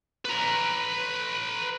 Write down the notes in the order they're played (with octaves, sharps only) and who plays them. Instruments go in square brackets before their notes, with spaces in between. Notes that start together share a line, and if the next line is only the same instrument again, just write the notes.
[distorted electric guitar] B4 A#5